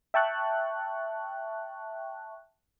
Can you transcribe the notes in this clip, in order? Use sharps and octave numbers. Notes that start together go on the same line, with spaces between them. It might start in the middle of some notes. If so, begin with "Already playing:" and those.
E5 G5 A5 C#6 F#6